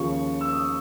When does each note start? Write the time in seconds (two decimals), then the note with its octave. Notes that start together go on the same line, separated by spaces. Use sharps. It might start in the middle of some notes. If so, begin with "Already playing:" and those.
Already playing: D#2 C#3 F3 C#6
0.41 E6
0.53 D#6